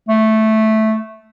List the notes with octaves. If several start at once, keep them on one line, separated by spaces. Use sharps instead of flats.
A3